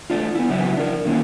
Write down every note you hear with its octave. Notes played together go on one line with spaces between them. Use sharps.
A3 D4 F4
B3 E4
C#3 F#3 E4 B4 D5 E5
D4 A#4
D3 D#3 F#3 A#3 C#4 E4